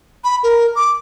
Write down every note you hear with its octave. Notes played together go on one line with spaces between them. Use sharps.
B5
A#4
D6